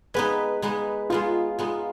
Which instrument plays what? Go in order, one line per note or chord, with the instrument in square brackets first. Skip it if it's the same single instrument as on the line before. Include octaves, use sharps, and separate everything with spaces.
[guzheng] G#3 B3 D#4 [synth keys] B4
[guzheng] G#3 B3 D#4
[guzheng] G#3 B3 D#4 [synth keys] F4
[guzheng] G#3 B3 D#4